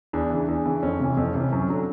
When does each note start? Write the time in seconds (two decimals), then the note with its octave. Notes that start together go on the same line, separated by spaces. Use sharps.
0.13 E2 D4
0.30 C#3 E3
0.48 E2
0.66 C#3 E3
0.83 F2 C#4
0.99 C3 E3
1.17 F2 C#4
1.28 C#4
1.34 C3 E3
1.40 C#4
1.52 F#2
1.69 D3 F#3